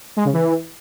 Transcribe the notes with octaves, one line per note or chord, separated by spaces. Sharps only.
G#3
C#3
E3